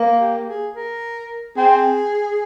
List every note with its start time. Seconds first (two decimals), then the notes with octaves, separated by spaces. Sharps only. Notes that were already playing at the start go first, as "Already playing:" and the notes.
Already playing: A#3
0.20 G4
0.47 G#4
0.75 A#4
1.57 C4 G#4